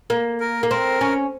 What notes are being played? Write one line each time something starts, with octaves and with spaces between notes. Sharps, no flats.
A#3
A#4
A#3
C4 A#4
C#4